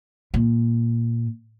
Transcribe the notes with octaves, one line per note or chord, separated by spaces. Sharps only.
A#2